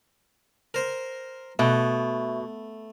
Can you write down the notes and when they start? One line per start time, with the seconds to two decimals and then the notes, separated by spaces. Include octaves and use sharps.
0.74 A#4 C5
1.59 B2 A3 E5